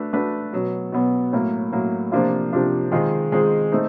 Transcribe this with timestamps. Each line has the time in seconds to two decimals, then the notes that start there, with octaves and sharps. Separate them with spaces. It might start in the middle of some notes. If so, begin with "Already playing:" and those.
Already playing: A3 D4 F#4 B4
0.13 A3 D4 F#4 B4
0.53 B2 F#3 B3
0.92 B2 F#3 B3
1.33 A2 F#3 A#3
1.72 A2 F#3 A#3
2.12 C3 F3 A#3 D4 F4
2.53 C3 F3 A#3 D4 F4
2.92 D#3 G#3 C4 F4 G#4
3.32 D#3 G#3 C4 F4 G#4
3.72 A3 C4 D#4